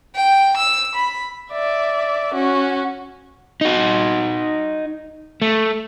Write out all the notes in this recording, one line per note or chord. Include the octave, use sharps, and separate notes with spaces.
G5
E6
B5
D5 E5
C#4 F#4
D#4 F#4
A3